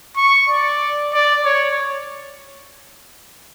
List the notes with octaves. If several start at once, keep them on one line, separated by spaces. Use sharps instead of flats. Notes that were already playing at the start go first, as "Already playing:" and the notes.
C#6
D5
D5
C#5